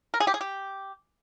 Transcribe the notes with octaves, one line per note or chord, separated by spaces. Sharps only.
A#4
G#4
G4
G#4
G4